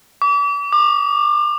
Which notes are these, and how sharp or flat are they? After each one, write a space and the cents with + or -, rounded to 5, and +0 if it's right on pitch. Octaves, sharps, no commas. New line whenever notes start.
D6 -40
D6 +35